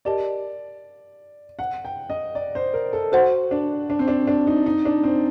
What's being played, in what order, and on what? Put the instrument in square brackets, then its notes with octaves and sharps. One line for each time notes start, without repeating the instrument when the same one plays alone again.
[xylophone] G4 A#4 D#5 A5 [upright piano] D5
[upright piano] F#5
G5
D#5
D5
C5
A#4
A4
[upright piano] F#4 [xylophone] C5 F#5 C6
[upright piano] D4
D4
C4
D4
D4
D#4
D#4
D4
C4